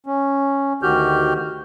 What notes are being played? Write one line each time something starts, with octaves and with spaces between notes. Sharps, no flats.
C#4
D2 D#3 F#4 G4 F6 G6